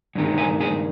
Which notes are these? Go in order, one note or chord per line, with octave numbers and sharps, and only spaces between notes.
G2 D#3 G#3
G#3 G#4
G#3 G#4